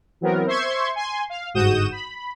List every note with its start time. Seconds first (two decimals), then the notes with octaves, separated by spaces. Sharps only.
0.21 E3 F#3 B3 C4 A#4
0.46 C5 E5 C6 C#6 G#6
0.96 G#5 C6
1.30 F5
1.54 G1 G#2 F#4 D#6 G6 E7
1.92 B5